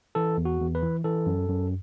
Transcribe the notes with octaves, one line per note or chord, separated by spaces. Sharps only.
E3 A4
E2
F#4
E2
B4
E3
E3 A4
F#2
F#2